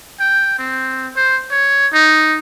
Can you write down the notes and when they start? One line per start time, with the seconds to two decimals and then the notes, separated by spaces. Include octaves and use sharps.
0.20 G5
0.58 C4
1.16 C5
1.51 C#5
1.93 D#4